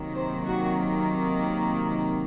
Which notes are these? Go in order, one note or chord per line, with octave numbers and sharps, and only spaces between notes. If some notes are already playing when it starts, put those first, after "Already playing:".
Already playing: C3 D#3 F#3 A#3
C5
F#4